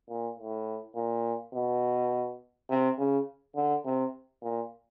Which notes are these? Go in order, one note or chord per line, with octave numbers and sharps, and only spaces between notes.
A#2
A2
A#2
B2
C3
C#3
D3
C3
A#2